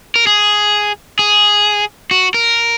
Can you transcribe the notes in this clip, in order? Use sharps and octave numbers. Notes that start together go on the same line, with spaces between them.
A#4
G#4
G#4
F#4
A#4